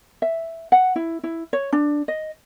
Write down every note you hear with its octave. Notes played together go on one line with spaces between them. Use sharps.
E5
F#5
E4
E4
C#5
D4
D#5